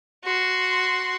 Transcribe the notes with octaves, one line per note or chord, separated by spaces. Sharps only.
F#4 C6